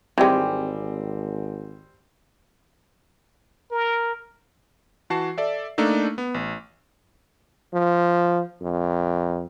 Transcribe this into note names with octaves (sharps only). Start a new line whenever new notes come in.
G#1 E3 G3 G#3 C4 G4 G5 G#5
A#4
E3 F#4 A5 C7
A4 D5 E5
A3 A#3 D4 D#4 A4
B3
A1
F3
F2